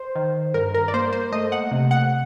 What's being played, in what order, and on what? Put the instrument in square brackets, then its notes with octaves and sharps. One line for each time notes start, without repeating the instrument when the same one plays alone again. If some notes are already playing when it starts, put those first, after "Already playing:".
Already playing: [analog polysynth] C5
D#3
G2 A#4
A#4
D5
A#3 C5
C5
A3 D#5
F#5
C3
F#5